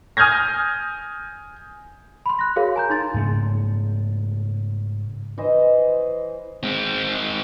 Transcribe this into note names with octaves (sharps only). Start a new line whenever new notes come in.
G#5 D#6 F6 G6 G#6 A#6
B5 C6
F#6 A#6
F#4 G#4 A#4 C#5 F5
G#5 A#5 G6
D#4 C6 A6
G#2 C#3 A3 A#3
E3 C5 D#5
G#3 C4